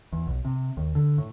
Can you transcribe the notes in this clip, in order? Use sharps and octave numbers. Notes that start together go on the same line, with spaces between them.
E2
B1
C3
D#2
D3
A2